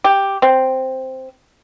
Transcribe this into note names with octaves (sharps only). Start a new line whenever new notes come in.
G4
C4